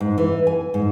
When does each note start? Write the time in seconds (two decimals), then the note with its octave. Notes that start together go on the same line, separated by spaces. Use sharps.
0.01 G#2
0.18 E3
0.47 G#5
0.74 G#2